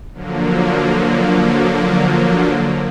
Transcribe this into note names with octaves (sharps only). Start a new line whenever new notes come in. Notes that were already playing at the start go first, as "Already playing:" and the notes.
D3 F3 F#3 A#3